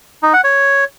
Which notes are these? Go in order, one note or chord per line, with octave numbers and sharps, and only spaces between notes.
D#4
F#5
C#5